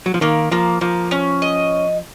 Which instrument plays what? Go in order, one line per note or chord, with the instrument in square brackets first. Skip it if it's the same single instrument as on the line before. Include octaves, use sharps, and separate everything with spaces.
[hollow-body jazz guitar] F#3
F3
[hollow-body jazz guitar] D#3 [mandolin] A#3
[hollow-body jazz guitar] F3 [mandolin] A#3
[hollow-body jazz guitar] F3 [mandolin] A#3
[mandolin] C#4
D#5